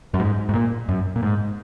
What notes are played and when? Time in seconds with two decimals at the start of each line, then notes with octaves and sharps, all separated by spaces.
0.14 F#2
0.20 G#2
0.49 G#2
0.54 A#2
0.89 F#2
1.16 A#2
1.23 G#2